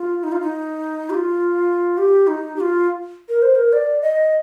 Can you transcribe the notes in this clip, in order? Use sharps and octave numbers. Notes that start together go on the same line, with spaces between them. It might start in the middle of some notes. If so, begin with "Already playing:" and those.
Already playing: F4
D#4
F4
D#4
G4
F4
G4
D#4
G4
F4
A#4
C5
A#4
D5
D#5